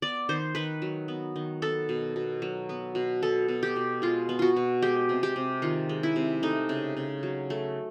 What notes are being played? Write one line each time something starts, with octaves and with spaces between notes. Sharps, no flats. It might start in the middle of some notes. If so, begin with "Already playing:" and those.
B3 D5
D#3 C5
D#3 B4
F#3
B3
D#3
B3 A4
B2
B2
F#3
B3
B2
B3 A4
B2
G4
B2
G#3 F4
B3
F4 F#4
B2
G#3 G4
C3
G4
C3
D#3 F4
G#3
E4
C3
A3 D#4
C#3
C#3
F#3
A3